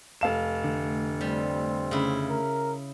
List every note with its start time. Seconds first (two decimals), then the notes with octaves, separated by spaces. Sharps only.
0.21 F1 F5 E7
0.64 D3 A3
1.21 G3 C4
1.91 C#3 E4
2.30 A#4